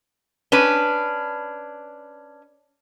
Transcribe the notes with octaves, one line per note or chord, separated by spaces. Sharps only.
C#4 D4 B4